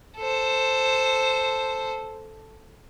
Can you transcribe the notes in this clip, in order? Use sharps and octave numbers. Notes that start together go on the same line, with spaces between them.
A4 C5